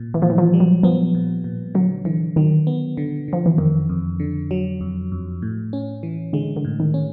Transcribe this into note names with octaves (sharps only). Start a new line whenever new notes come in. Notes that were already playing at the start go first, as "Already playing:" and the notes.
Already playing: A#2
E3
A#2 F3
E3
F3
G3
F#3
F3 B3
A#2
A#2
D3 F#3
D3 E3
D#3 F#3
B3
D3
D3 F3
E3
F2 D#3
F2
D3
F#3
F2
F2
A2
C#4
E3
D3 G#3
D3
A2
D#3
C#4